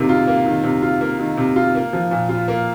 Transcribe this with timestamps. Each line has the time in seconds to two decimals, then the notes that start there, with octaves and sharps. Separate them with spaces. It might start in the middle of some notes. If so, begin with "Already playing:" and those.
Already playing: C3 D#3 A#3
0.09 F4
0.27 A#3
0.46 D#3
0.63 C3
0.82 F4
1.01 A#3
1.19 D#3
1.37 C3
1.56 F4
1.75 A#3
1.93 F3
2.11 A#2
2.29 F4
2.48 A#3